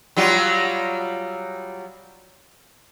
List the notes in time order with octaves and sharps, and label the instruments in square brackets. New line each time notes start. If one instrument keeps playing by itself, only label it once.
[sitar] F#3 G3 F4